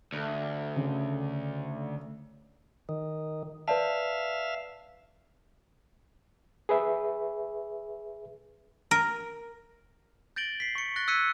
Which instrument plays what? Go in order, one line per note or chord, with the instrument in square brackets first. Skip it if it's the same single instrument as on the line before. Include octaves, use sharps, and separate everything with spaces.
[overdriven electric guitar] D2
[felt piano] C#3
[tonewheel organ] D#3
[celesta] B4 D5 A5 [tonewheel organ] E5 F5
[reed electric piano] G#4 B4 E5
[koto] A#4
[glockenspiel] G6 A6 A#6 D7 F#7 G7
B6 C7
C#6 C#7
F#6 A6 A#6 G7
E6 F#6 G#6 B6 C#7 D#7